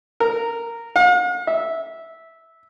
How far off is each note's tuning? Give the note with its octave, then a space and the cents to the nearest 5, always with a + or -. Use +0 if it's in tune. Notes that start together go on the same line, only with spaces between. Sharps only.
A#4 -10
F5 +45
E5 -10